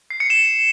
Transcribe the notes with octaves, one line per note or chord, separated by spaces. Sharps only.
C7
C#7
E7